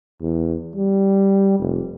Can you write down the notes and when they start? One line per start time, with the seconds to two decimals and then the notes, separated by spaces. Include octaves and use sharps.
0.21 E2
0.76 G3
1.60 F1